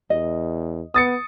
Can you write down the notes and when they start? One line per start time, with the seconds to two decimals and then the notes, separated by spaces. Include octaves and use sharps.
0.10 E2 D#5
0.94 B3 D#6 A6 C#7